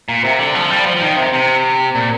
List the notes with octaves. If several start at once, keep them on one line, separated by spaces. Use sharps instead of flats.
A#2
C3
D3
F3
G3
F3
F3
D#3
C3
C3
A#2